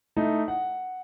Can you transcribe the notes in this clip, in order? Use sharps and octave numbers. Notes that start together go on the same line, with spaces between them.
A3 D#4 E4
F#5